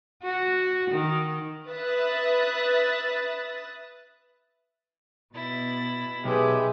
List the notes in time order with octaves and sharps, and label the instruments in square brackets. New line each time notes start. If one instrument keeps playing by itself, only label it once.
[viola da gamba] F#4
D#3
[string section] B4 E5 D#6 F#6 A6
[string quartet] B2 A6 [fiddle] E4
[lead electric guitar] B1 [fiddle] G#3 [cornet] G4 [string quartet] G#4 B4 E5